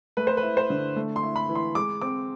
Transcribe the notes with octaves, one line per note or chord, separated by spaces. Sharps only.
A3 B4
C5
B4
E4
C5
D3
A3
C6
E4
B5
E3
C6
G#3 D6
C4 D6